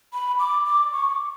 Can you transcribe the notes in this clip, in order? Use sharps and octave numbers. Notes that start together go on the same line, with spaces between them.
B5
D6
D6
C#6
D6